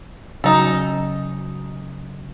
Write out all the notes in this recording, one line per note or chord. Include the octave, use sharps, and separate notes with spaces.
C#3 F#3 D#4 G#4 A4